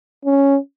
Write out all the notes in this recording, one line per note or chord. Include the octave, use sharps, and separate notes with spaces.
C#4